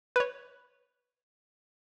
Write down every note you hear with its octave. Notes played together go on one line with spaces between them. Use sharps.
B4 C#5